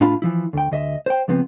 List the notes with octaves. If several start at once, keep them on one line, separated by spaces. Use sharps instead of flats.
A2 D4 F4 F5 B5
E3 F3 E4
D2 G5
D2 D#5 E5
C5 G5
C#2 F3 B3 C4